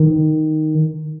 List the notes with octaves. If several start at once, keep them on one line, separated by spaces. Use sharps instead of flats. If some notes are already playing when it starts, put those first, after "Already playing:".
Already playing: D#3